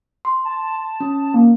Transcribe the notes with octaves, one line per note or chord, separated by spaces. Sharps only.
C6
A5
C#4
A#3